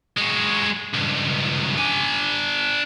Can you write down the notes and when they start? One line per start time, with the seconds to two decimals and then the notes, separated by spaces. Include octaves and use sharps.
0.17 G#3 F#4
0.94 C#2 G2
1.78 D4 G#5